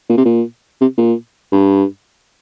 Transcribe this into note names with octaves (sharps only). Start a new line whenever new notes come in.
A#2
C3
A#2
C3
A#2
G2